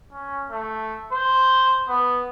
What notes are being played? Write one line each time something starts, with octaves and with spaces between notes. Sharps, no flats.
C#4
A3
C5
B3